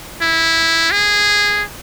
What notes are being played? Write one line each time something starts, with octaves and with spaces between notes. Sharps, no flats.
E4
G#4